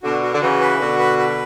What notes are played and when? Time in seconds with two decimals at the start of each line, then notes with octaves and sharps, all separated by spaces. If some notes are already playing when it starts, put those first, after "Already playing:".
0.03 B2 D3 F#4
0.22 F#4
0.34 D3
0.41 C#3 E3 F#4
0.61 B4
0.79 B2 D3 F#4
0.99 B4
1.18 B4